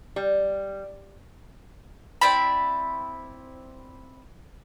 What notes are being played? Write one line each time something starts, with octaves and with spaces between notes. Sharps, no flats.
G3
C4 E4 D5 B5